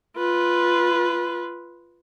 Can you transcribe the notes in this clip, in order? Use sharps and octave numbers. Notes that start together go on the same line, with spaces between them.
F4 B4